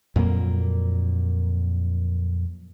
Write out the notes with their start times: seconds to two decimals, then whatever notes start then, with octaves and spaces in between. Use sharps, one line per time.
0.16 F2 A#2 F#3 A#3